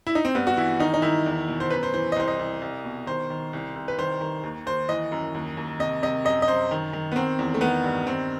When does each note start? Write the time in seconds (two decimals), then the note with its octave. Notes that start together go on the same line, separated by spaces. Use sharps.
0.07 E4
0.15 D#4
0.25 C4
0.35 G2 B3
0.47 F#4
0.57 E3 E4
0.80 D#3 D#4
0.94 D#4
1.02 D#3 E4
1.26 E2
1.48 B2
1.60 C5
1.70 F#2 B4
1.83 C5
1.94 E3 C5
2.12 D#5
2.16 C2 C5
2.28 D#5
2.39 C2
2.61 C2
2.84 B2
3.07 D#3 C5
3.30 D#3
3.53 C2
3.76 C2
3.88 B4
3.98 D#3 C5
4.21 D#3
4.43 D#2
4.66 D#2 C5
4.89 E3 D#5
5.12 F#2
5.34 D#2
5.57 D#2
5.79 C3 D#5
6.03 C3 D#5
6.25 F#2 D#5
6.42 D#5
6.48 F#2 C5
6.71 D#3
6.93 D#3
7.12 B3
7.16 D#3 C4
7.39 E2
7.54 A3
7.61 D#3 B3
7.84 G2
8.07 D#3 C4